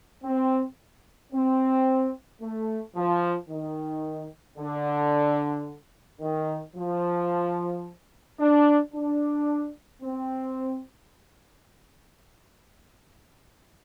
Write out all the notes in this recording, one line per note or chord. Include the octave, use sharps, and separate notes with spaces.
C4
C4
A3
F3
D#3
D3
D#3
F3
D4
D4
C4